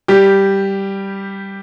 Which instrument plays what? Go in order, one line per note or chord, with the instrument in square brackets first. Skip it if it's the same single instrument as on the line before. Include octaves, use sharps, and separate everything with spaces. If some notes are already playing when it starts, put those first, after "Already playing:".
[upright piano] G3 G4